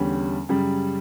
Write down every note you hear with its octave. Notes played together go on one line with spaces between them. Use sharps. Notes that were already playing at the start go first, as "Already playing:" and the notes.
Already playing: E2 D3 G3 C#4
F#2 C#3 G3